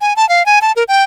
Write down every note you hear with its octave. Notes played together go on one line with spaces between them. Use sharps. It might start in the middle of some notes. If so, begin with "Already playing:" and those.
G#5
A5
F5
G#5
A5
A#4
G5